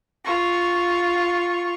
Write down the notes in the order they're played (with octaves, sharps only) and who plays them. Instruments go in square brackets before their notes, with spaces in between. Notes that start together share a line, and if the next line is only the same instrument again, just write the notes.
[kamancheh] F4 C#6